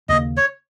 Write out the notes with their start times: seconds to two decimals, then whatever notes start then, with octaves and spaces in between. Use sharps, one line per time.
0.09 D#2 C#3 G3 A#3 D#5
0.37 C#5